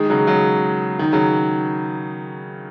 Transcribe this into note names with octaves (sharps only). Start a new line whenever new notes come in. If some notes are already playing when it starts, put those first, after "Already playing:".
Already playing: D#3 G#3
C#3 F#3
C#3 F#3
D#3
C#3 F#3